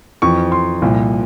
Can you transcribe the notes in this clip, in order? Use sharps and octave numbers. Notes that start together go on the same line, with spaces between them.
F2 E3 C#6
C6
C2 A#2 F3